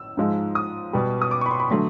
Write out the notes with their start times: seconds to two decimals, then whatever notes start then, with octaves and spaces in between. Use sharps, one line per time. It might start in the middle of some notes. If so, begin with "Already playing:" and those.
Already playing: E6
0.17 G#2 F3 G#3
0.55 D#6
0.93 B2 G3
1.22 D#6
1.31 D6
1.41 C#6
1.46 B5
1.51 C6
1.60 B5
1.70 D3 F#3 A3 C6